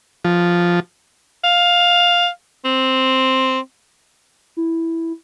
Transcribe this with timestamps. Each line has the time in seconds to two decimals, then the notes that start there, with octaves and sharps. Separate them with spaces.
0.25 F3
1.44 F5
2.65 C4
4.57 E4